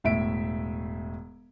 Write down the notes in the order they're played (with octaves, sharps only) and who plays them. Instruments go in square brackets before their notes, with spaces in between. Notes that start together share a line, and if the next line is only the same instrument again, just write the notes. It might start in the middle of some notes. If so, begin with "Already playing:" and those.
[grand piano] E1 A2 E5 D7